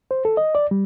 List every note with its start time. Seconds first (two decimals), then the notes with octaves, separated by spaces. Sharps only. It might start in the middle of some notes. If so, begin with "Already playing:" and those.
0.11 C5
0.25 A4
0.37 D#5
0.55 D5
0.71 G3